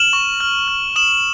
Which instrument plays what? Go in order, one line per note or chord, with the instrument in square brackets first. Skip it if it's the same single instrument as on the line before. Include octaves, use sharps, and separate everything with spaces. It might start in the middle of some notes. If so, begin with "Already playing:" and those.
Already playing: [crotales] F6 E7 F#7
C#6
F6
F6
D#6 E7 F#7